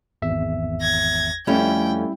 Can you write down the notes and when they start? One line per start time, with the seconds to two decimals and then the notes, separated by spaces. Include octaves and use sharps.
0.22 G#1 E2 E5
0.81 G#6 A#6
1.47 F2 G3 A3 C#4 E4 G5